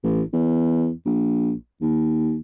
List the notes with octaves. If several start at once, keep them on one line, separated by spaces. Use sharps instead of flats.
A1
E2
A#1
D#2